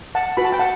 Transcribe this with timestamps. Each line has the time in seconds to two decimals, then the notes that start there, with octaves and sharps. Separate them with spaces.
0.15 F#5 A5
0.37 F#4 B4 B5
0.45 A5
0.52 G5
0.59 F#5 A5